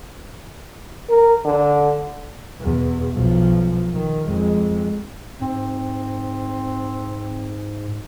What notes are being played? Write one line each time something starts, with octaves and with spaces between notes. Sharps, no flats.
A#4
D3
E2 B2
B1 F3
D#3
F2 G#3
G#2 C4